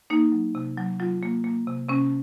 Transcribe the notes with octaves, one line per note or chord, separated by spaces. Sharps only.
A#3 D#4
F#3
C3
F#3
F#3 F4
A#3
A#3
C3
C3 C#4